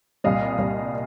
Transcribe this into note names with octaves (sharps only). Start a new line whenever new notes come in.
C2 A#2 G3 D#5 F5
C2 A#2 G3